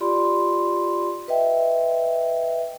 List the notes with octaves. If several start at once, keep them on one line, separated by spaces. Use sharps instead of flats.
F4 G4 D5 B5 C6
B4 D#5 E5 G5